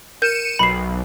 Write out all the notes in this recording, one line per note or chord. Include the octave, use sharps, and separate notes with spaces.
A#4 G6 C#7 D#7 E7
B1 B5 C7